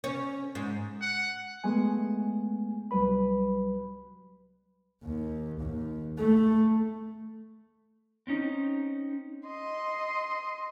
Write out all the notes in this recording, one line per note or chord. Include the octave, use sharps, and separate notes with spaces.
C#4
G#2
F#5
G#3 A3 B3 G#5
C2 F#3 G3 B4 B5
D#2
D#2
A3
C4 C#4 D#4
D#5 C6